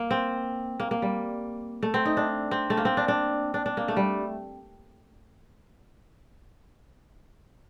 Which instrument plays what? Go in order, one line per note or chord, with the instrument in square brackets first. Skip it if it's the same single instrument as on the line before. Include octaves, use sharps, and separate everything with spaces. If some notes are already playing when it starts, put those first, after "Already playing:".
Already playing: [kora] A#3
C4
A#3
A#3
G3
A3
C4
D#4
D4
C4
A3
A#3
C4
D4
D4
D4
D4
A#3
A3
G3